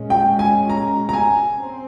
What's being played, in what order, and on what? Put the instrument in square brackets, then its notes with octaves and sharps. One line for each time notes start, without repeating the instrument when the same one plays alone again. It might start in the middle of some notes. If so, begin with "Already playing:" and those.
Already playing: [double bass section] A#2 G#3 C#4
[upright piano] G5
G#5
A#5
A#5
G#5
[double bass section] C4